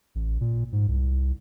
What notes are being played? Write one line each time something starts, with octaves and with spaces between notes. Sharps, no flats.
A1
A#2
G#2
C2